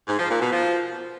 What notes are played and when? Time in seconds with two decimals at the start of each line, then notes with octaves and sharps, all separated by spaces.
0.08 G#2
0.19 F3
0.30 A#2
0.41 B2
0.52 F3